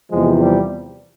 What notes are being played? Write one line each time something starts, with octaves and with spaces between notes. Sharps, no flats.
E2 C3 F3 G#3
G3